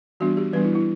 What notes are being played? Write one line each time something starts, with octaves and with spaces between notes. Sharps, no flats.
E3 G3 B3 D4 F#4
G4
E3 G3 B3 D4 B4
E4
E4